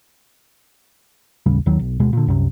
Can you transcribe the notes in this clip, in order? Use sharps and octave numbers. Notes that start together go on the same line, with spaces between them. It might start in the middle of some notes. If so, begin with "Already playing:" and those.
A1 D#2 C#3 G3
D#2 D#3 F#3
B1
D2 B2 G#3
A#2 D3
C2 F#2 C3